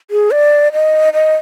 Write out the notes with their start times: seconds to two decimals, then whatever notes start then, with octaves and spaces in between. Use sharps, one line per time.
0.11 G#4
0.31 D5
0.73 D#5
1.13 D#5